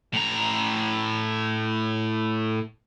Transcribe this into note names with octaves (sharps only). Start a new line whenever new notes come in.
A2 A#5